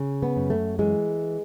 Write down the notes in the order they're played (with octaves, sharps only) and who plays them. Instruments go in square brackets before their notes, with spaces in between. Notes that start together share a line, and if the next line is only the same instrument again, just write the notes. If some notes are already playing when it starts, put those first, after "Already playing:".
Already playing: [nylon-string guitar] C#3
B3
F#2
A3
E3 G#3